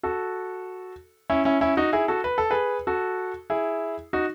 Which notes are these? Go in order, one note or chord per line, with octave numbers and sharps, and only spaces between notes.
F#4 A4
C#4 E4
C#4 E4
C#4 E4
D#4 F#4
E4 G#4
F#4 A4
B4
A4
G#4 B4
F#4 A4
E4 G#4
D#4 F#4